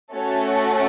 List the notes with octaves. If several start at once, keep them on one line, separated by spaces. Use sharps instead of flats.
A3 C#4 F#4 A4 C#5